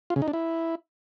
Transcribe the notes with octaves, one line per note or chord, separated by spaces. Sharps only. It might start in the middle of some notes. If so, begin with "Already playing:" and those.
F4
C#3
D#4
D4
E4